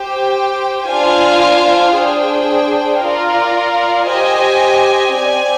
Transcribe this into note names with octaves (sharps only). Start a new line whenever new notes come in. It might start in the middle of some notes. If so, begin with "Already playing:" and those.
Already playing: G4 C5 G5
D4 F4 C5 F5 G#5
D4 G#4 C5 G5
F4 A#4 D5 F5
G4 C5 D#5 G#5
C4 G4 D5 G#5